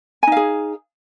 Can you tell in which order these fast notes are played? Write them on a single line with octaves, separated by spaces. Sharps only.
G#5 D#4 F5 G#4